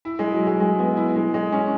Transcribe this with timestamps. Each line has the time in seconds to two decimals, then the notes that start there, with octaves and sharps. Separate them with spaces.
0.05 E4
0.19 G#3
0.33 F#3
0.47 G#3
0.60 G#3
0.79 B3
0.97 E4
1.16 G#3
1.34 G#3
1.52 C#4